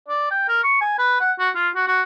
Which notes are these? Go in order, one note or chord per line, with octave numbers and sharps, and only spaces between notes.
D5
G5
A#4
C#6
G#5
B4
F#5
F#4
F4
F#4
F#4